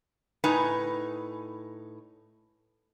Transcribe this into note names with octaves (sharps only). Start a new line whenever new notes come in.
A2 D#4 B4 G#5